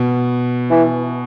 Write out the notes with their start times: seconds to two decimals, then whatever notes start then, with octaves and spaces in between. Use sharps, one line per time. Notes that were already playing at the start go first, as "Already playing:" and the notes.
Already playing: B2
0.70 E3